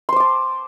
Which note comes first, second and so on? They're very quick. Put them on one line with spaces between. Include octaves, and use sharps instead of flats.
C6 C5 D6 A5